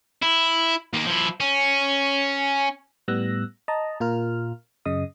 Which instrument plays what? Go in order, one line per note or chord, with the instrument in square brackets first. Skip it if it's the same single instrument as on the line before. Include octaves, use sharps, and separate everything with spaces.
[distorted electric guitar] E4
D#2 A#3
F3 E4
C#4
[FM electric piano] A2 G3 B3 E6 F#6 A#6
D#5 A5 A#5
A#2 F4 A#4 F6
F#2 C#3 D#5 D#6